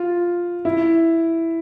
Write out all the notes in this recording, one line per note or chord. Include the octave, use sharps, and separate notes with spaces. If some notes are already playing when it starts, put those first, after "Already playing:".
Already playing: F4
E4